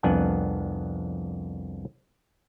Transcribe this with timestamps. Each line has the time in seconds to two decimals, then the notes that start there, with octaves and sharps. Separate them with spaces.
0.03 C2 F2 B3 D4 F#5 G#5